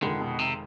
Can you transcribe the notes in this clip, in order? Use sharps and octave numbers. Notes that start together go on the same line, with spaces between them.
F1 F2 D3 D#3 G#3
B2
C3